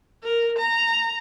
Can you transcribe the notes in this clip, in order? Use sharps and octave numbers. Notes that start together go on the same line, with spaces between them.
A#4
A#5